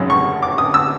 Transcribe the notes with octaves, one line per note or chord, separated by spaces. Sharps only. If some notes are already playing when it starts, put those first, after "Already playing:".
Already playing: G#1 F#2 C#3
C#6
D6
D#6
E6